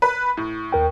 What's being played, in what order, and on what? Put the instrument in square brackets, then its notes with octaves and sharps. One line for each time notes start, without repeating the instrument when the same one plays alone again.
[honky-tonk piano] B4
A2
[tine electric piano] D#2 A#4 G5